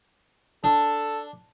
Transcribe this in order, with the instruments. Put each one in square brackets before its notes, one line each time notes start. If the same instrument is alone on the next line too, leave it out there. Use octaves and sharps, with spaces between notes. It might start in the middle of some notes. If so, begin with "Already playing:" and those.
[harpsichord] D4 [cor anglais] A4